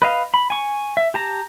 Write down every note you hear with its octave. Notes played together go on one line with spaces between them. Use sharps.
B4 D#5 F5
B5
G#5 C#6
E5
G4 A5 A#5